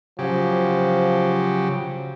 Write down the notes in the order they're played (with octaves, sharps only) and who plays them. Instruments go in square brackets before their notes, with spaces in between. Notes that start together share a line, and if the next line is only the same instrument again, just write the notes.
[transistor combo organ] C#3 F#3 G4 [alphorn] F3